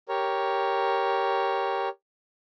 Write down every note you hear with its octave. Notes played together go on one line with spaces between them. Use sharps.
G4 A#4 C#5